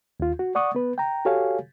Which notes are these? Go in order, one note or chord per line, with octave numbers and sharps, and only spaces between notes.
D#2 F4
F#4
D5 F#5 C#6 D#6
B3 B4
G5 A#5
F#4 G4 A4 C#5 F5 G#5